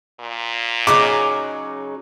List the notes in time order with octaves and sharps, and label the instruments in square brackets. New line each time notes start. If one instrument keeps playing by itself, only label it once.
[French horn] A#2
[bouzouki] C#3 F#3 D#4 [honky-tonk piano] D6